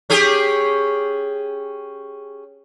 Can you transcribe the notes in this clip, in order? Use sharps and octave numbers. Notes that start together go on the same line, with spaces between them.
C#4 G4 G#4